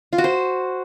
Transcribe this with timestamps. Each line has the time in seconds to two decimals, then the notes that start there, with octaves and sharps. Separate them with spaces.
0.13 F4
0.18 F#4
0.24 C5